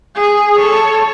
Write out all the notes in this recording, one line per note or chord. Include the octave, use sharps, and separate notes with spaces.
G#4
A4 C#5